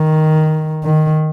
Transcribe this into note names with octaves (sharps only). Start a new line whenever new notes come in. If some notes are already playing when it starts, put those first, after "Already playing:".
Already playing: D#3
D#3